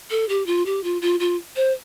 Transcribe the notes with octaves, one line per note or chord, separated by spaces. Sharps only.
A4
G4
F4
G4
F4
F4
F4
C5